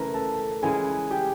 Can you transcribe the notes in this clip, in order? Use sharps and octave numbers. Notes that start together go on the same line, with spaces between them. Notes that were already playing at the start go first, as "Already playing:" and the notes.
Already playing: C#3 E3 A3 A#4 B4 A#5
A4 A5
C#3 E3 G#3 G#4 G#5
G4 G5